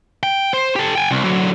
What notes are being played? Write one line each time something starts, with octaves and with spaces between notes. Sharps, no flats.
G5
C5
G4 A4
G5 G#5
C2
D3 F#3